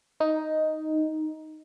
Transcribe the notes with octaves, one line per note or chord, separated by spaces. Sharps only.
D#4